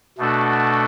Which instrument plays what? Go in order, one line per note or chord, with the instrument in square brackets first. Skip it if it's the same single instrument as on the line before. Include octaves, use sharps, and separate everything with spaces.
[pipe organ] B2 A3 D4 F#4 A4